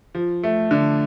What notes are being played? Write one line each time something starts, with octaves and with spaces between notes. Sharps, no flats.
F3
A3
D3